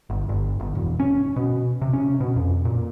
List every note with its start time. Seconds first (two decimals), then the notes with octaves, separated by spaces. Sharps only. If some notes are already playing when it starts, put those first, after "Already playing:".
0.10 G1
0.29 G1
0.60 G1
0.75 E1
1.00 C#4
1.36 B2
1.82 C3
1.93 C#4
2.21 B2
2.36 F2
2.65 A#2